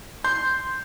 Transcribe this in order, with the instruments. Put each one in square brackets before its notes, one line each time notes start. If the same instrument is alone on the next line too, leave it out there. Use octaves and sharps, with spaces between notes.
[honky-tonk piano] C6 [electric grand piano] G6